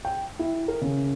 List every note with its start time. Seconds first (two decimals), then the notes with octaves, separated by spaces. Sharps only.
0.05 G5
0.39 E4
0.68 A#4
0.81 C#3